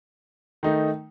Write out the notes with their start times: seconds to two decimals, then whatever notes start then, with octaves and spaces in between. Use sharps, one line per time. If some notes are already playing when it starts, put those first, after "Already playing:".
0.63 D#3 A3 D#4